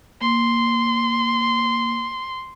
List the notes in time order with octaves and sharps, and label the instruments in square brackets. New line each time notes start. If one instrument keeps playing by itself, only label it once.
[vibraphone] A#3 [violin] C6